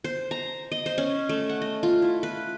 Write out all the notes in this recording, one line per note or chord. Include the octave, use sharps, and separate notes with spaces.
C5
A#5
D#5
C5
C#4
A3
F#5
D#5
F4
E4
B4